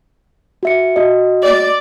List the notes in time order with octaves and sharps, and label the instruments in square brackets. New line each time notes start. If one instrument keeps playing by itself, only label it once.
[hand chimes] F#4 E5 C#7
F#4 D#5
[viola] D5